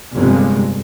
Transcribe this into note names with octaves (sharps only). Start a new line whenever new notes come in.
G1 F2 C3 G#3